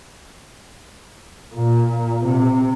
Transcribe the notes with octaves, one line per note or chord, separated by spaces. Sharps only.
A#2
C3